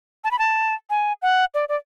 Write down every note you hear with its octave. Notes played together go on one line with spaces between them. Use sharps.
A5
B5
A5
G#5
F#5
D5
D5